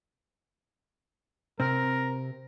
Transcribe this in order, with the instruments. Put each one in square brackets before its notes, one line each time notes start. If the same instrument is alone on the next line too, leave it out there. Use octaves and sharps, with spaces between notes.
[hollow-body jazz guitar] C3 C4 [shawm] A#4